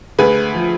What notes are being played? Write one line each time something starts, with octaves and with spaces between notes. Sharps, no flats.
D2 G#4 B4
F3